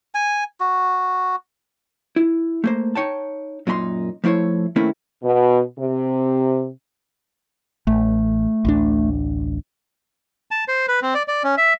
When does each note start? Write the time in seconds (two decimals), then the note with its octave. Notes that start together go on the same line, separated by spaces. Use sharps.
0.15 G#5
0.60 F#4
2.16 E4
2.64 A3 A#3 C5
2.95 D#4 C#5 G5 A5
3.67 F#2 A#2 D#4 B5 C6
4.24 F3 A3 E4 C5 C#5
4.76 D#3 A3 A#3 C4 C#4 E4
5.23 B2
5.79 C3
7.87 A1 A3
8.65 A1 D2 D4
10.51 A5
10.68 C5
10.88 B4
11.02 C4
11.15 D5
11.28 D5
11.44 C#4
11.58 E5